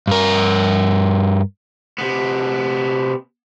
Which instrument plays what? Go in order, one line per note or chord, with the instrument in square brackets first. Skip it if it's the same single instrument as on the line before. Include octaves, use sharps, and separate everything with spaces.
[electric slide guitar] G2 A#4
[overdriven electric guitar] C3 B3